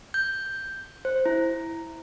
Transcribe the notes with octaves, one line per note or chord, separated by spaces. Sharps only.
G6
C5
E4